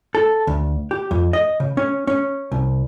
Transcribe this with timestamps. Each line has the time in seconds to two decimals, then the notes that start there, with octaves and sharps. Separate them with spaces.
0.15 A4
0.47 D2
0.91 G4
1.11 F2
1.33 D#5
1.60 C#3
1.77 C#4
2.07 C#4
2.52 C2